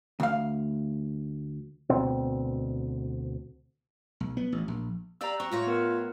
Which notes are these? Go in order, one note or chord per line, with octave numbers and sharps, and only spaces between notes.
D2 F5
D2 B2 C4
B1
B3
A1
A#1
G4 D5 F5 A#5 E6
C4 F#4 C#6
A2 F4 F#4 C#5
B3 A#4 F#5